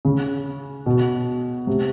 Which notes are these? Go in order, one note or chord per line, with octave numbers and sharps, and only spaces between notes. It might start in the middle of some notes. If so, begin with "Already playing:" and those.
C#3
B2
C3